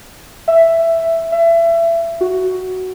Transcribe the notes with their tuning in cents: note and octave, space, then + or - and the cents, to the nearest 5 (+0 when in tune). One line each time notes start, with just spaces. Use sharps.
E5 +5
E5 +25
F#4 +5